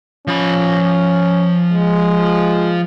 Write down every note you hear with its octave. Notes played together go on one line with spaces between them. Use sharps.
F3 C#4 B5
G#3